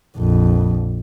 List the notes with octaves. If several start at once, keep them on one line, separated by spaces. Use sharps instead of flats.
A#1 F2